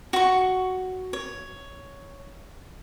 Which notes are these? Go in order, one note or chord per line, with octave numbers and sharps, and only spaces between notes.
F#4 C#6
C#5